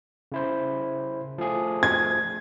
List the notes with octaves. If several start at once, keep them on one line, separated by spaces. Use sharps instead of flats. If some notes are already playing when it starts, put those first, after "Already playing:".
C#3 E4 C5
F3 A3 G#4
G#6